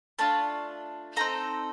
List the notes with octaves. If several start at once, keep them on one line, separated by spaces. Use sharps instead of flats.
A3 D4 F4 A5
C4 D#4 A4 A#5